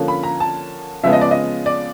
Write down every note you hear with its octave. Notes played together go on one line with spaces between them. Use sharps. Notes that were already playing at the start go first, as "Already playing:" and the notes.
Already playing: D3 F3 A#3 C#4
B5
A#5
A5
C#3 F3 G#3 B3 E5
D#5
D5
D#5
D5